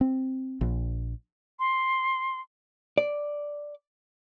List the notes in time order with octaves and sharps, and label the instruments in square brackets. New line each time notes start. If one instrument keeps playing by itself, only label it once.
[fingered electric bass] C4
A#1
[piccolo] C6
[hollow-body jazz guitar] D5